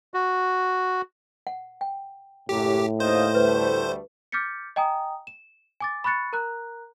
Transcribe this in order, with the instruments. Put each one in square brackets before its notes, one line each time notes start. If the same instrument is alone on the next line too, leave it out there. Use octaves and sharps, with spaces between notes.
[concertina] F#4
[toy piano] F#5
G5
[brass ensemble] F#1 F#2 [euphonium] A2 [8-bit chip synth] G4
[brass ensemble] D#2 D#5 F5 [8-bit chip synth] C5
[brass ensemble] D2 G3 A3 [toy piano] B4
[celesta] D6 F6 G6 A6 B6 C#7
D#5 G5 G#5 A#5 D#6
E7
G#5 D6 A6
B5 C#6 F#6 A6 C#7
A#4 A#5 F#6